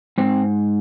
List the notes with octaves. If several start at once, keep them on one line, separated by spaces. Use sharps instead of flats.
G#2 C4